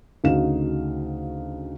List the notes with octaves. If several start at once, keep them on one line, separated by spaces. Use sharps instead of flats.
D2 C#3 D#4 F#4 F5 E7